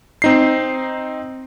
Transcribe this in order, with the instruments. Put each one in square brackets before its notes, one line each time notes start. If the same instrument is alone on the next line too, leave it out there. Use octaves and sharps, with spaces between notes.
[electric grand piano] C4 D#4 C7